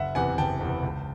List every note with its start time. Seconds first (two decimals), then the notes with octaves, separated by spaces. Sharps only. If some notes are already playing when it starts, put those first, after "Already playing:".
Already playing: F#1 E5 F#5
0.15 E2 C3 E3 F#5 G#5
0.38 F#1 G5 A5
0.60 E2 C3 E3
0.83 C#2